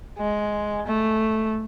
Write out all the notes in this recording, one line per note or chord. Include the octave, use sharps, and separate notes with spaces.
G#3
A3